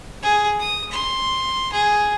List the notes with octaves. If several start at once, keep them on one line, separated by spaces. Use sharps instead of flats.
G#4
D#6
C6
G#4